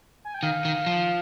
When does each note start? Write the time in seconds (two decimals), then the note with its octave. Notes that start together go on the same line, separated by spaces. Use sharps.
0.25 G#5
0.34 G5
0.43 D#3 F5
0.65 D#3
0.86 F3